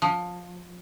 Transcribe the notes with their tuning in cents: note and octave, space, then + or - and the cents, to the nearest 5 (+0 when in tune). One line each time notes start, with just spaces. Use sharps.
F3 +15